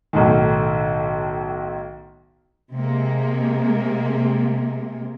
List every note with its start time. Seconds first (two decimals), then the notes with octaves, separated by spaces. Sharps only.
0.13 B1 A2 D#3
2.74 C3 G#3 A#3